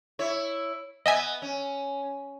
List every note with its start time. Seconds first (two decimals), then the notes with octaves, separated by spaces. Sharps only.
0.19 E4 C#5
1.06 B3 D#5 E5 G#5
1.42 C#4